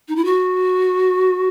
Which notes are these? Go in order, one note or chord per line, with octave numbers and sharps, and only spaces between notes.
D#4
E4
F#4